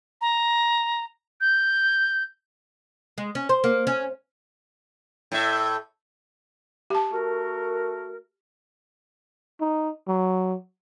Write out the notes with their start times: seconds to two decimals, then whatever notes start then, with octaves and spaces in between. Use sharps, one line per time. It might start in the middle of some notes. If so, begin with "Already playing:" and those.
0.21 A#5
1.41 G6
3.18 G#3
3.35 C#4
3.49 C5
3.64 A#3
3.87 C#4
5.32 A2 E5
6.90 G4 A5
7.12 A3 F#4 A#4
9.61 D#4
10.08 F#3